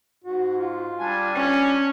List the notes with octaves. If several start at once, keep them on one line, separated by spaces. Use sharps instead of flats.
G#2 F#4
F4
G3 D4 G#5
C#4